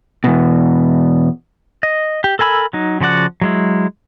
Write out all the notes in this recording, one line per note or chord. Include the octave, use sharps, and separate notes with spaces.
E2 B2
D#5
G4
A4 A#4 G#5 B5 E6
F#3 D#4
C#3 F3 F#4 D5 F#5
F#3 G#3 E4